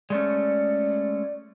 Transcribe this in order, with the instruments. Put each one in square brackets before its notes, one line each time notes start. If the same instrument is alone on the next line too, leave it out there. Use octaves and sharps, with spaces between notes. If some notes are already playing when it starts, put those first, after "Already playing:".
[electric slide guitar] G#3 A3 C#4 [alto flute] D5